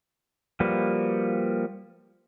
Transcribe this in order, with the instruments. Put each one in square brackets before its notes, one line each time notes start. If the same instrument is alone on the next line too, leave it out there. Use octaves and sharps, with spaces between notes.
[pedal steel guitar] F3 G3 A#3 F#4 B4